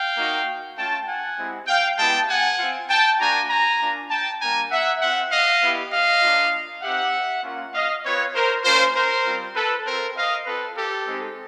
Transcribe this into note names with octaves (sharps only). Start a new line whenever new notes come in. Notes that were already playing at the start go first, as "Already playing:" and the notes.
Already playing: F5 G5
A#3 D#4 F#4
A3 C#4 F4 G5 A5
F#5 G#5
G#3 C4 E4 G4
F5 G5
G#3 B3 E4 G4 G5 A5
F#5 G#5
C4 F4
G5 A5
A#3 D4 F#4 G#5 A#5
G#5 A#5
A#3 D4 F4
G5 A5
G3 A#3 D4 G#5 A#5
E5 F#5
C4 F4 E5 F#5
D#5 F5
B3 E4 G4
D#5 F5
A#3 D4 F4
C4 D#4 G4 E5 F#5
A#3 C#4 F4
D#5 F5
C4 F4 B4 C#5
A#4 C5
A#3 C#4 F4 A#4 C5
A#4 C5
G3 C4 F4
A4 B4
C4 F4 A#4 C5
D#5 F5
C4 F4 A4 B4
G4 A4
G#3 C4 D#4